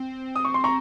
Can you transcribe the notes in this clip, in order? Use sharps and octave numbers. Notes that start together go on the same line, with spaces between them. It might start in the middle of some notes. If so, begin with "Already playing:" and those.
Already playing: C4
D#6
C#6
C6
A#5 C#6